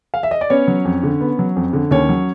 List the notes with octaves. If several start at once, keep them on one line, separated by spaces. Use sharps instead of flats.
F5
E5
D#5
D5
B3 C#4 C#5
F#3
F2
D3
B3
F#3
F2
D3
D#2 C#4 C#5
F#3